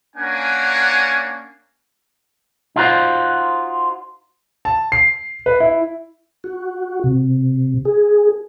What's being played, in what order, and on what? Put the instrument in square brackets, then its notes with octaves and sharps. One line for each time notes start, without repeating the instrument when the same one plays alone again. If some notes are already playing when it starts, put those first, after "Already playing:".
[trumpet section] A#3 C#4 D4 A#4 F#5 G#5
[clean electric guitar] D#4 F4 F#4 C5
[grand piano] A5
C7
B4
E4
[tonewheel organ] F#4
C3
G#4